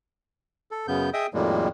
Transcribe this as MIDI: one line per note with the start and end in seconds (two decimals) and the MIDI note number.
0.71 0.87 69
0.88 1.10 42
0.88 1.10 49
0.88 1.10 59
0.88 1.10 91
1.13 1.27 68
1.13 1.27 75
1.13 1.27 76
1.13 1.27 79
1.13 1.27 87
1.34 1.68 41
1.34 1.68 45
1.34 1.68 51
1.34 1.68 55
1.34 1.68 56
1.34 1.68 58